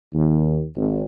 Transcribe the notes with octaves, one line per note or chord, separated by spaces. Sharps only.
D#2
G#1